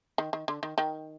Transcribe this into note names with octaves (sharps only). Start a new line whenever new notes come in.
D#3
D#3
D3
D#3
D#3